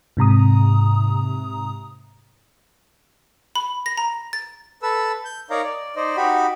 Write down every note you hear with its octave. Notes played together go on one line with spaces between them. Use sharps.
G#2 C3 A#5 D#6
B5
A#6
A#5
A6
A4 B4 E6
G6
D#4 A#4 C#5 D5 F5 A#5
D5
D#4 C5 D5 D#5
D#4 F#4 G4 B5